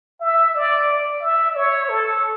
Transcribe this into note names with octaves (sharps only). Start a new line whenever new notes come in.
E5
D5
E5
C#5
A4